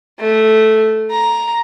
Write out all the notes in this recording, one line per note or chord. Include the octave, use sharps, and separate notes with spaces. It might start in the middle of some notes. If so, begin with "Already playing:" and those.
A3
A#5